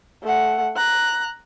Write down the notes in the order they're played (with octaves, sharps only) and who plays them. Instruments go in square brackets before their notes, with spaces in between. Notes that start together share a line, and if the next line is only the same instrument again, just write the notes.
[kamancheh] A3 F#5
A#5 F#6